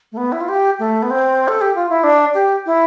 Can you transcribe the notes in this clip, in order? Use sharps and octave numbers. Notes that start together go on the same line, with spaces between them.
A3
B3
E4
F4
G4
A3
B3
C4
A4
G4
F4
E4
D4
G4
E4